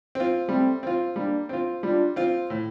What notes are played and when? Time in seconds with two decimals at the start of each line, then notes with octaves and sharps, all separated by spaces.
0.15 C4 F4
0.49 G3 A3 C4
0.83 C4 F4
1.16 G3 A#3 D4
1.49 C4 F4
1.83 G3 D4 F4
2.16 C4 F4
2.50 A2